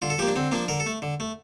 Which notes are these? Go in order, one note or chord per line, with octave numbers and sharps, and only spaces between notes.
D3 F4
A4
F3 A#3 G4
D4
D3 C4
F3 A#3 D4
D3 A#4
A4
A3
D3
A3